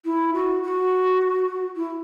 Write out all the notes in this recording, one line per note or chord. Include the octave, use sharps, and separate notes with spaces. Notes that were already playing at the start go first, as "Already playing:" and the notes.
E4
F#4
F#4
E4